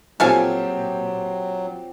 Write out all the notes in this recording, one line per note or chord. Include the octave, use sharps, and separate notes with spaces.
A#2 F3 F#3 C4 G4 A4 F5 G#5